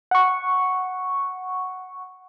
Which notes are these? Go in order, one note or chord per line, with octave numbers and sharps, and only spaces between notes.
F#5 C#6